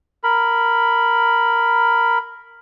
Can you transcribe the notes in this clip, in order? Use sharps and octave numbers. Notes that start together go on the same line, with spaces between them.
A#4 B5